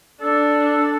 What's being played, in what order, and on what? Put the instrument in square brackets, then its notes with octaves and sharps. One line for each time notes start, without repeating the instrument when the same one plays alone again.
[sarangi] D4 [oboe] A4